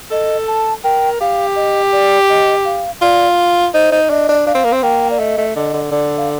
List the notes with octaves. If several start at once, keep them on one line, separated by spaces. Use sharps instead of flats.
A4 D#5
A5
A#4 G5
G4 F5
D#5
D5
D#5
F5
F4 D5
D#4 C5
D#4
D4 D#5
D4
D4 F5
C4
A#3
C4
A#3 G5
D5
A3 D#5
A3
D3 D#5
D3
D3 D5
F5